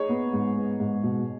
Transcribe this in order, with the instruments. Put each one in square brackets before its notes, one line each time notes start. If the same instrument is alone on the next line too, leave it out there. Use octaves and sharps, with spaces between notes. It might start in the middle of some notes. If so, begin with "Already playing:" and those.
Already playing: [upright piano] D#4 G#4 C#5
[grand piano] B3
G#2
B3
G#2
B2